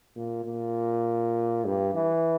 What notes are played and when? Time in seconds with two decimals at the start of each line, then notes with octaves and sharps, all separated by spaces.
0.16 A#2
0.45 A#2
1.65 G2
1.95 E3